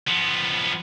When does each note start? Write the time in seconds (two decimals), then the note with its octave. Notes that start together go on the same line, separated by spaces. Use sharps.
0.08 F3 B3